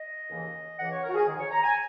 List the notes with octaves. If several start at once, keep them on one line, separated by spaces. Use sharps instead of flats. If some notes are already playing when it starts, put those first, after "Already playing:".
Already playing: D#5
D#2 C#3 E3
C#2 C#3 E3 F#5
C#5
A#4
F#4
G#4
G#2 D#3
C#5
A#5
G#5